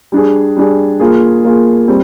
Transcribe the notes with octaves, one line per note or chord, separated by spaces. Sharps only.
G3 D4 G#4
G3 D4 G#4
A#3 F4 G#4
A#3 F4 G#4
G3 C4